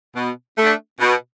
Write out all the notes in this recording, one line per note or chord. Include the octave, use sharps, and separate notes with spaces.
B2
A3
D4
B2